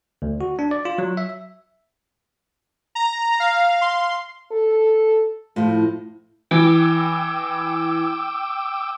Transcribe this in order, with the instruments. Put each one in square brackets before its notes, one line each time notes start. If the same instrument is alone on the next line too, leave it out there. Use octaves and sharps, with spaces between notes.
[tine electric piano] D2
F#4
D4
D5
F4
F#3
E5
[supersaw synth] A#5
F5
C6
[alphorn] A4
[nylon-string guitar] A2 F3 [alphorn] F4
[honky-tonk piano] E3 [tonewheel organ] G5 D6 E6